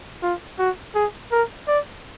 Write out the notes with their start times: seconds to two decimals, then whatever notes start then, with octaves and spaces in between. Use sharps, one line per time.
0.23 F4
0.59 F#4
0.95 G#4
1.32 A#4
1.68 D5